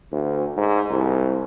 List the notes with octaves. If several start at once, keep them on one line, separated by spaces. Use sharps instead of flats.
D2
G#2
C2